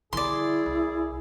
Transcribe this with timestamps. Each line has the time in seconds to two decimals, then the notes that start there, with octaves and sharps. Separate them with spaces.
0.13 D3 G3 E4 G#4 D5 C6
0.66 C2